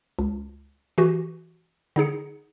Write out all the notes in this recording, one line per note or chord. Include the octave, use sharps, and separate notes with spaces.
C#2
E3 F#4 G4
D3 D#4 G#4 C#7